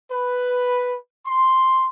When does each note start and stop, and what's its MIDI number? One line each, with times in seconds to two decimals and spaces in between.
0.11 0.95 71
1.27 1.87 84